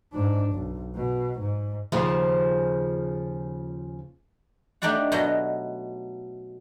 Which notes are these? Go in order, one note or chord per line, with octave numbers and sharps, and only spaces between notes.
G#2 D4
B1
B2
G#2
D#2 C#3 F3
A3 D4 D#4 G4 D5 F#5
B2 F#3 F#4 D#5